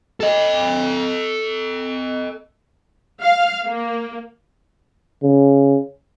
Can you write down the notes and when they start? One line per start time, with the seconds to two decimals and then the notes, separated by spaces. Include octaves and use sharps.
0.20 A4 D#5
3.21 F5
3.66 A#3
5.23 C#3